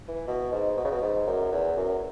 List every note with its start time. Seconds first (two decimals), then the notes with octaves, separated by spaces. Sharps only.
0.08 E3
0.28 B2
0.52 G#2
0.77 B2
0.85 C#3
0.91 B2
1.02 G#2
1.27 F#2
1.52 E2
1.77 F#2